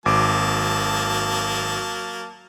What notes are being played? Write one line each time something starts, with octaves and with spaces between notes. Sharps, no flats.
G#1 F#3 A#3 A5 D6